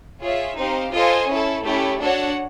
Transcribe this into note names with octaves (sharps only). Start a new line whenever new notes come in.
F4 G#4 C#5 E5
C4 D#4 G4 C5 F5
F4 A4 C5 D#5 G#5
C#4 E4 A4
A3 C#4 E4 G4
D4 F#4 A4 C#5 F#5